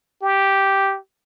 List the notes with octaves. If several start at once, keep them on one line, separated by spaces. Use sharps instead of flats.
G4